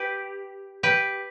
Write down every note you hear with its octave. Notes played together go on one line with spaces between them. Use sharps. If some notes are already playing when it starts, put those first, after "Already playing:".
Already playing: G4 B4
G4 B4